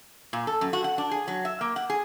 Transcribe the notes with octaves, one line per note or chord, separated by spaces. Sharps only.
A#2
A4
F#2
F#4
F#5
D4
G#4
F#3
E5
A#3
F#5
G#4